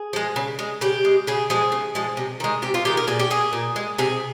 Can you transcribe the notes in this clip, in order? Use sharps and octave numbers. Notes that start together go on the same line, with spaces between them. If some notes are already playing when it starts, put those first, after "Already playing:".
Already playing: G#4
F3 G#3
C#3
G#3
C#3 G4
G#3
C#3 G#4
F3 G#3 G#4
C#3
F3 G#3
C3
D#3 G#3
C3 G4
F4
D#3 G#3 G4
A#4
A#2 G#4
G4
G#3 G#4
A#2
G#3
C3 G#4